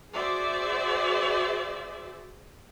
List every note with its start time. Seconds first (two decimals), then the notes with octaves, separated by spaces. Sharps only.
0.14 F#4 G#4 C5 D5 E5